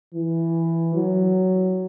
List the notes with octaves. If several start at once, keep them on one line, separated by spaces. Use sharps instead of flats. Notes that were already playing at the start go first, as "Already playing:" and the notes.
E3
F#3